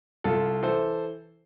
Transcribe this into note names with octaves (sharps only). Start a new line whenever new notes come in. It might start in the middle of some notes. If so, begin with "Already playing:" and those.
C2 F4 A4
E3 A4 C5